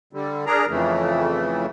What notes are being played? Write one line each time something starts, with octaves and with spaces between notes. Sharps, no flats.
D3 G3
D4 G#4 A#4 A#5
F2 C#3 E3 A3